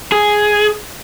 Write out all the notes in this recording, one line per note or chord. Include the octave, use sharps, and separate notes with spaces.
G#4